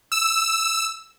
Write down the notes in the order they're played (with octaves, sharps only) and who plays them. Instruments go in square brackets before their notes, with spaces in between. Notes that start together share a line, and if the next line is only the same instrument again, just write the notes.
[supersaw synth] E6